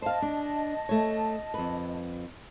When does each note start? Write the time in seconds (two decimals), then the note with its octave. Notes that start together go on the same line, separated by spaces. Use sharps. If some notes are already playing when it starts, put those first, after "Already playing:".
0.02 C5 D#5 F5 A5
0.22 D4
0.89 A3 C#5
1.54 F2 B4